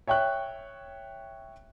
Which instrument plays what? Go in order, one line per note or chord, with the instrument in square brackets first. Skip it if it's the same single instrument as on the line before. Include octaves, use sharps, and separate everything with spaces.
[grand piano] C#5 E5 G5 C#6 F#6